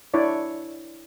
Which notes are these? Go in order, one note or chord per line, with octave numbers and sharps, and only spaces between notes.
D4 E4 C#5 D5